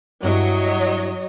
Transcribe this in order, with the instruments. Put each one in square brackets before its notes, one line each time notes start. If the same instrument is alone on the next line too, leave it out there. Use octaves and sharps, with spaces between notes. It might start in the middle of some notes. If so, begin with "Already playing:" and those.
[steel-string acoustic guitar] G2 E4 [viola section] F#3 C#5 D#5